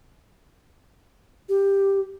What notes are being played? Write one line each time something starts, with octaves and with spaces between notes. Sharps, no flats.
G4